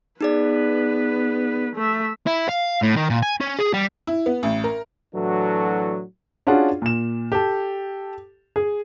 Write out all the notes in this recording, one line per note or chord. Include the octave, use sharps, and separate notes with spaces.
B3 D#4 G#4 B4 D5
A3 E5
E4
F5
A2
D#3
A#2
G#5
C#4
G#4
G3
E4
B3
A1
A#4
A2 E3 F#3 D4 F#4 A4
C#4 D4 F4 F#4 G#4 F#5
A#2 E7
G4 A4
G#4